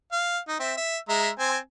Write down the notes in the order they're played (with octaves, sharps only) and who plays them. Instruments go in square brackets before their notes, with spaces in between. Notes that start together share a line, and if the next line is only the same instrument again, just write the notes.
[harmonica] F5
D#4
C4 E5
E5
G#3 E5 A#5
C4 C5 G#5